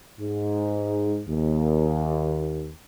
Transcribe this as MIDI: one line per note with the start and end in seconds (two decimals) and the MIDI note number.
0.20 1.22 44
1.28 2.73 39